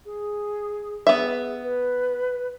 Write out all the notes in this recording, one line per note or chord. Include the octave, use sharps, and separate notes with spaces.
G#4
B3 G#4 E5
B4